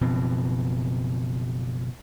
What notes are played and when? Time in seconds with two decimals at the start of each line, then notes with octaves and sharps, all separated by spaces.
0.01 F#1 B2 F3 C4